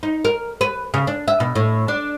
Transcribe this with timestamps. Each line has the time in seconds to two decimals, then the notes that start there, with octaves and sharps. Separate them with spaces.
0.03 D#4
0.25 A#4
0.61 B4
0.94 C#3
1.07 D4
1.28 E5
1.40 B2
1.55 A2
1.88 D4